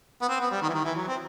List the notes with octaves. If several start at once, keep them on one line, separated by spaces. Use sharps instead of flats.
B3
C4
B3
G3
D#3
E3
D#3
E3
F#3
C4